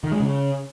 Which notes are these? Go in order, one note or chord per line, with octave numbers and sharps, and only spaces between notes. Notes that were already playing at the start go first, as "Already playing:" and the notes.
D#3
G#3
C#3